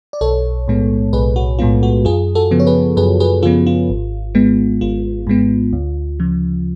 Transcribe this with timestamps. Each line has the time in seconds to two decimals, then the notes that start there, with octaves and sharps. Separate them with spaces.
0.13 D5
0.21 B1 A4 C#5
0.68 A2 G#3 B3
1.13 B1 G#4 B4
1.36 F#4
1.59 A2 G#3 B3 F4
1.83 F#4
2.05 F#2 F4 G#4
2.35 F#4 A4
2.51 C#3 F3 B3
2.60 C#5
2.67 G#4 B4
2.97 F#2 G#4 B4
3.20 G#4 B4
3.43 C#3 F3 B3 F4 G#4
3.67 F4
3.90 G#1
4.35 G#2 G#3 B3
4.81 G#1 F4
5.27 G#2 G#3 B3
5.73 D2
6.20 C#3 F3